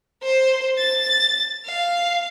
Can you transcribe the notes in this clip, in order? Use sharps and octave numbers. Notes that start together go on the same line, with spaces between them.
C5
A6
F5